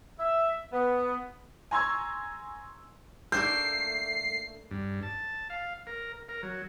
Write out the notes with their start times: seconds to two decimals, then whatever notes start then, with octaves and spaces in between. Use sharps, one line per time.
0.19 E5
0.72 B3
1.71 G#5 A#5 C6 C#6 E6 G#6
3.32 A3 A#3 D4 G6 C7
4.71 G2
5.03 A5
5.50 F5
5.87 A#4
6.29 A#4
6.43 F#3